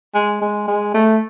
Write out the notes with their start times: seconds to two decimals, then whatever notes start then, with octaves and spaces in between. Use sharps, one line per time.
0.14 G#3
0.41 G#3
0.68 G#3
0.94 A3